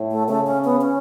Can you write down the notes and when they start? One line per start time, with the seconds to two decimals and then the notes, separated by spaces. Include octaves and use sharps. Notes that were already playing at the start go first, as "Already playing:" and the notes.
Already playing: A2
0.11 A3
0.28 C#3 A3
0.47 C#4
0.64 B3
0.81 C#4